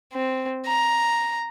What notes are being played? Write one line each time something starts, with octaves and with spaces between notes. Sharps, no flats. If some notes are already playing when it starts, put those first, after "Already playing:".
C4
A#5